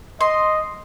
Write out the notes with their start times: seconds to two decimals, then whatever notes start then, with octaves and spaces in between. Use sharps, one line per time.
0.21 D#5 C6